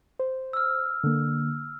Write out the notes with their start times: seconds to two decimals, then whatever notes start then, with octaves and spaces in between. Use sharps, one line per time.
0.19 C5
0.53 E6 F6
1.04 D3 A#3